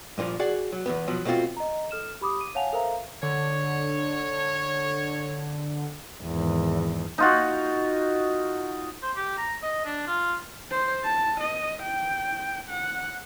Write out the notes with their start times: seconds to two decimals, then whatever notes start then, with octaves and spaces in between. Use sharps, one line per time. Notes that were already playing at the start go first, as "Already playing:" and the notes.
0.18 G2 A#2 D3 F3
0.40 F#4 G#4 D5 F#5
0.72 F#3
0.86 E2 G#2 B3
1.08 B2 F3 F#3
1.25 B2 A3 C4 F4 F#4
1.57 D#5 A#5
1.91 A4 F6 E7
2.21 G4 B5 D6 D#6
2.41 D#7
2.55 C#5 F5 F#5 G#5 A5 F7
2.73 A4 A#4 C5 E5 F5 A#5
3.23 D3 C#5
6.23 G#1 E2
7.18 D#4 F4 F#4
9.02 C5
9.16 G4
9.38 A#5
9.63 D#5
9.85 D4
10.07 F4
10.71 C5
11.04 A5
11.41 D#5
11.83 G5
12.70 F#5